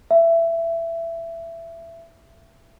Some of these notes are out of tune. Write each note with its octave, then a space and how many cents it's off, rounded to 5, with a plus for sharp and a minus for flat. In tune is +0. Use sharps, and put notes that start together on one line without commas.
E5 +20